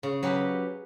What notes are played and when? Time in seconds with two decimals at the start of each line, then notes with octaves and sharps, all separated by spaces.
0.03 C#3
0.23 F#3 C#4 G4 B4